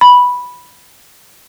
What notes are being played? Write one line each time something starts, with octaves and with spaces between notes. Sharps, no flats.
B5